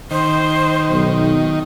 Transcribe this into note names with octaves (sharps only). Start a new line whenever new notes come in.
D#3 C5
B1